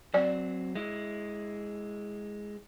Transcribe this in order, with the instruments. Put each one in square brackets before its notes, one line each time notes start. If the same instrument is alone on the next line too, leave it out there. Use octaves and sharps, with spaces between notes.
[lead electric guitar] F#3 C4 [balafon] D5
[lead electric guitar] G#3 E4